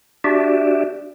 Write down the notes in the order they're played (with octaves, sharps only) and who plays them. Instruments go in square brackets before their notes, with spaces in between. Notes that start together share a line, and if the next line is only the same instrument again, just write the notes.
[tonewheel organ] D4 F#4 G4 D5 E5